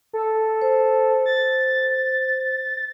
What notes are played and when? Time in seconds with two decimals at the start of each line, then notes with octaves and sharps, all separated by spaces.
0.13 A4
0.62 C5
1.26 A6